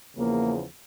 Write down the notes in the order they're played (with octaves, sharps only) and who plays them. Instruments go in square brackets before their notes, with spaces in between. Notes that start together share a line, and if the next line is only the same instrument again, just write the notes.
[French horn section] E2 C#3 F3 A#3